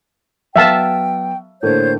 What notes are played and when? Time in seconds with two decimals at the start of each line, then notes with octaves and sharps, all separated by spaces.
0.56 F#3 B3 E5 F5 G5 A5
1.63 A2 D3 A#3 C5 C#5 G6